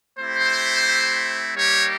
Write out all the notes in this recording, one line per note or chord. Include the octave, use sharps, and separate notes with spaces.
A3 C4 E4 G4 C5
G3 A#3 D#4 G4 C#5